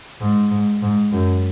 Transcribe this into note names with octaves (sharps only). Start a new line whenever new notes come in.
G#2
G#2
G#2
F#2